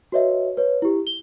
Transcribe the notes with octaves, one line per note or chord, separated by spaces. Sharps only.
F#4 B4 C#5 D#5 E5
B4 C#5
E4 G4
G7